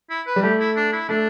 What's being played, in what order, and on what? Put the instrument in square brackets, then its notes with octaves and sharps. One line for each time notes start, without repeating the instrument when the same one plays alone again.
[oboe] E4
B4
[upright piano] G3
[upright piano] A3 [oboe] G4
[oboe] E4
D4
E4
[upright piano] A3 [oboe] D4